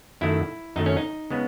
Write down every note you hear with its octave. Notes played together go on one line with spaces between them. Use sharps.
F#2 D#3 A3 E4
F#2 D#3 A3 D#4
C#4
D#4
C#3 G#3 B3